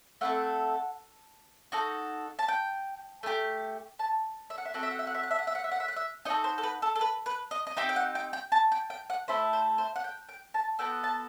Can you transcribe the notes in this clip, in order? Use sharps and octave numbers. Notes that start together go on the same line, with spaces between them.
A3 C4 E4 A4 F#5
D#4 F#4 A4
A5
G5
A3 D#4 G4
A5
E5
F#5
E5
C4 F#4 A4 F#5
E5
F#5
E5
F#5
E5
F#5
E5
F#5
E5
F#5
E5
F#5
E5
F#5
E5
D#4 F#4 A4 D#5
C5
A4
B4
A4
A4
B4
B4
D#5
D#5
C4 D#4 G4 E5
G5
F#5
G5
G5
A5
G5
G5
F#5
A3 E4 A4 C5
C5
C5
F#5
G5
G5
A5
B3 F#4 A4 G5
A5